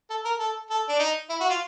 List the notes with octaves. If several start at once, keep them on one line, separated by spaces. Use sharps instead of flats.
A4
A#4
A4
A4
D4
D#4
E4
F#4
F4